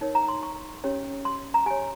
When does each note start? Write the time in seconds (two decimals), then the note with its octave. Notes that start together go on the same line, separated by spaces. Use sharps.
0.01 D#4 A#4 C#5
0.15 A#5
0.28 C6
0.43 C#6
0.84 C#4 G4 C#5
1.25 C6
1.54 A#5
1.66 G4 C#5 G#5